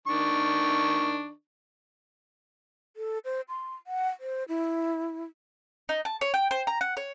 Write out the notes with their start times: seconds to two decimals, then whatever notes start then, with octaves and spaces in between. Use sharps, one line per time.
0.07 D#3 D4 C#6
2.97 A4
3.25 C5
3.49 C6
3.87 F#5
4.20 C5
4.48 E4
5.89 D#4
6.05 A5
6.21 C#5
6.34 G5
6.51 C5
6.67 A#5
6.81 F#5
6.97 C#5